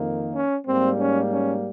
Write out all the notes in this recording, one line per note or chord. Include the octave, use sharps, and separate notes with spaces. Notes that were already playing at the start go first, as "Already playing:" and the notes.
Already playing: F2 D#3 A#3
C#4
G#2 G3 A#3 C4
C#4
C#4